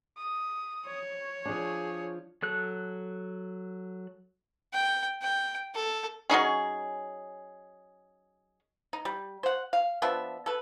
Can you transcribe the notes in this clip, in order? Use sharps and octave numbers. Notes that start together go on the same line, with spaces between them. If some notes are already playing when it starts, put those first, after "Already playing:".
D#6
C#5
F3 D4 G#4
F#3 A4 F#6
G5
G5
A4
F#3 C#4 D#4 G#4
D#4
G3
C5 F#5
F5
F3 B3 D4 E5
A4 B4